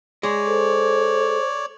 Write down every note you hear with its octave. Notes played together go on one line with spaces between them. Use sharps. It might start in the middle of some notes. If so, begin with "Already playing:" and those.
G#3 C#5 D5
A4 C5